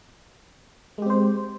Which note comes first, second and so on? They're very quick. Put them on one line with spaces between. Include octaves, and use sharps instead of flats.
G#3 G4 C4 C5